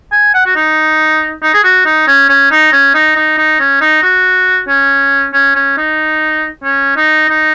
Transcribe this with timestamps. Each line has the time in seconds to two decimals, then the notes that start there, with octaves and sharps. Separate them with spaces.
0.12 G#5
0.34 F#5
0.46 F#4
0.55 D#4
1.43 D#4
1.54 G#4
1.64 F#4
1.85 D#4
2.08 C#4
2.29 C#4
2.51 D#4
2.72 C#4
2.94 D#4
3.16 D#4
3.38 D#4
3.60 C#4
3.81 D#4
4.03 F#4
4.68 C#4
5.33 C#4
5.55 C#4
5.77 D#4
6.64 C#4
6.96 D#4
7.29 D#4